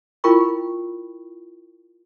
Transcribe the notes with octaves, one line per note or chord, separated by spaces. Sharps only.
E4 F4 A#4 G5 B5 C#6